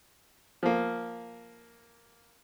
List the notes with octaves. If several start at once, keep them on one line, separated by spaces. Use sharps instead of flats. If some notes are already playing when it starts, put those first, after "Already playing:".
F3 A#3